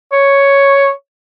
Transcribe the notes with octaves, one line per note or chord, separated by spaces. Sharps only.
C#5